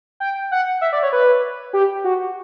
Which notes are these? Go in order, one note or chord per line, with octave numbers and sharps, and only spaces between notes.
G5
F#5
E5
D5
C#5
B4
G4
F#4